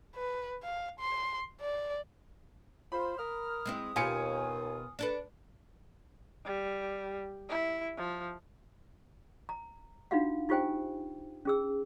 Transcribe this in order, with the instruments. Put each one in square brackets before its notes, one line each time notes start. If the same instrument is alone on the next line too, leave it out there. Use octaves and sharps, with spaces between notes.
[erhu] B4
F5
C6
D5
[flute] F4 [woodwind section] C5 [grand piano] B5
[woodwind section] A#4 F6 [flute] D#6
[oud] G#3 C4 E4
[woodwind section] D#2 [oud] B2 G4 [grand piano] F4 G#5 C#7
[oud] D4 A4 B4
[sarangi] G3
E4
F3
[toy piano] A#5
D4 D#4 F4 F#4 F5 F#5
D#4 F4 G4 C5 G5 G#5
C#4 G#4 E6